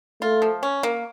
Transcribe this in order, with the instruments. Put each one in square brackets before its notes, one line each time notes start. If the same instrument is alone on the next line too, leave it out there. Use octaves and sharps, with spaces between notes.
[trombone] A3 [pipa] F4
[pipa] F3
C#4
A#3